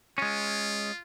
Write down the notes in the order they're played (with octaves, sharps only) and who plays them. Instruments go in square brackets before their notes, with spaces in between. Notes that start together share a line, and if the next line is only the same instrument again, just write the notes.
[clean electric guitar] G#3 C#4 [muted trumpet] F4